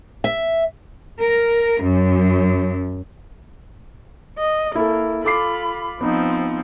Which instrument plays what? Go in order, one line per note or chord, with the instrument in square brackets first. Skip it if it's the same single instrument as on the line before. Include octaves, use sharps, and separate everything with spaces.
[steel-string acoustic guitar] E5
[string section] A#4
F#2
[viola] D#5
[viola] A#3 [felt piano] E4 A4
[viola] F4 B5 [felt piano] A4 D6 C7
[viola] F3 C4 [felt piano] B3 D#4